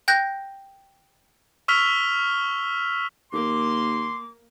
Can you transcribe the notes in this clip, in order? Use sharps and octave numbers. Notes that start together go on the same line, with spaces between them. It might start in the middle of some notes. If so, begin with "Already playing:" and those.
G5 F#6 G6 A#6
C#6 E6 F6 B6 F7 G7
D#2 A#3 C6 D6